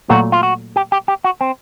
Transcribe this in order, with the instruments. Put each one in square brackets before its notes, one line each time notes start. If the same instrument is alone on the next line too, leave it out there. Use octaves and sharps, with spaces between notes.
[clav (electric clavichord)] A#2 F#3 A3 [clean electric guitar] F#4
[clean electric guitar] F4
F#4
G4
G4
G4
F#4
C4